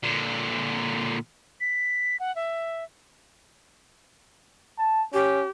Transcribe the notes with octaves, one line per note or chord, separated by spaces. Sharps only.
A#2 D3
B6
F#5
E5
A5
C#4 G4